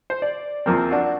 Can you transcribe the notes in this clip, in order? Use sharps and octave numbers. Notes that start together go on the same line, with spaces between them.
C5
D5
E2 F3 A#3 C4
D4 F#4